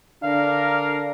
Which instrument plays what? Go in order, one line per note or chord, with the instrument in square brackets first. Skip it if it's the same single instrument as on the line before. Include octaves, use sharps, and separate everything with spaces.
[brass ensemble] D3 D4 A#4 [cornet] F5